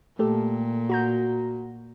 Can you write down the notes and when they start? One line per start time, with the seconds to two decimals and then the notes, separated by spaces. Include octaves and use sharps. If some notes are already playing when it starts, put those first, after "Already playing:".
0.19 A#2 A3 G4 A4
0.89 F#4 A#5 G6